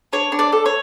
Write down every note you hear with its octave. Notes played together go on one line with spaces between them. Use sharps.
D4 C#5
D4
D5
A4
C#5